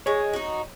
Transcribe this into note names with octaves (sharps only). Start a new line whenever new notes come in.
G#3 C#5
D#4 F#4